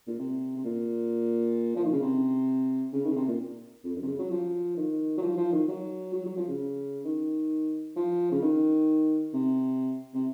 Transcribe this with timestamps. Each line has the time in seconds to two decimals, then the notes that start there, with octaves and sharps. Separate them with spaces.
0.07 A#2
0.18 C3
0.56 C3
0.64 A#2
1.76 F3
1.84 D#3
1.92 C#3
2.02 C3
2.93 C#3
3.04 D#3
3.11 C#3
3.16 C3
3.28 A#2
3.84 F2
3.96 F#2
4.02 C3
4.07 C#3
4.19 F#3
4.31 F3
4.77 D#3
5.17 F#3
5.22 F3
5.37 F3
5.52 D#3
5.68 F#3
6.13 F#3
6.26 F#3
6.37 F3
6.48 C#3
7.05 D#3
7.96 F3
8.31 C#3
8.42 D#3
9.34 C3
10.14 C3